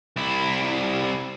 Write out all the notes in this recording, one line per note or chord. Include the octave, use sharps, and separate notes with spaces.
C2 E4